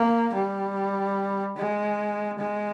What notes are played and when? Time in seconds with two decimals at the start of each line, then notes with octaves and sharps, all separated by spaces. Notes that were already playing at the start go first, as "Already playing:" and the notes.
Already playing: A#3
0.34 G3
1.57 G#3
2.39 G#3